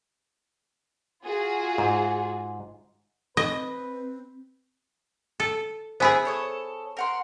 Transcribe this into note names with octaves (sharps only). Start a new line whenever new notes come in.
F4 F#4 G#4
G#2
C4 B4 D#5
A4
B3 E4 G#4 C5 G#5 B5
A4 C#5 D#6
A#4 F#5 C6